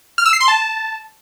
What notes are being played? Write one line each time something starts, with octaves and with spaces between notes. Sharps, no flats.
F6
E6
C7
C6
A5